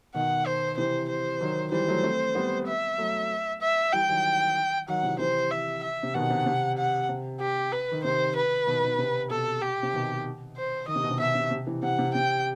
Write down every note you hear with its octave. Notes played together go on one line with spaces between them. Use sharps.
B2 D#3 F#5
C5
C3 E3 C5
C5
D#3 F#3
E3 G3 C5
F#3 A3
A3 C4
G3 B3
E5
F#3 A3
E5
E3 G3 G5
D#3 F#3
D#3 F#3 F#5
C3 E3
C3 E3 C5
E5
E5
C3
B2 D#3 F#5
C3
C3
F#5
C3
G4
B4
D#3
C3 C5
B4
B2 D#3
B2 D#3
C3
B2 A4
G4
C3
B2 D#3
C5
D#3 D#5
C3
B2
C3
B2 E5
C3
C3
C3 E3
C3 F#5
C3
C3 G5